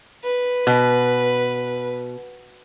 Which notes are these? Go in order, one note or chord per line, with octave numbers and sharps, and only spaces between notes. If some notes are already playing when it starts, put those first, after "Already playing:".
B4
B2